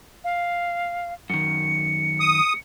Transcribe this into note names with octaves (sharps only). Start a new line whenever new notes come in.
F5
F#2 D#3 C#7
D#6